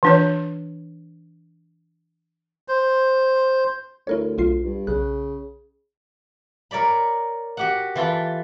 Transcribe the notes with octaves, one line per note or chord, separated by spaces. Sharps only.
E3 D4 C#5
C5
D2 E4 A#4 C#5
B1 F4 C7
G2
B1 C#3 F#6
A#4 C#5 D5 B5
F#4 G4 F#5
E3 F4 A4 B5